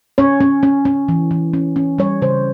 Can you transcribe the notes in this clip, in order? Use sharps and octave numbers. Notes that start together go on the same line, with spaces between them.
C#4 C#5
C#4
C#4
C#4
E3
E3
C#4
C#4
G3 C#5
C#3 C5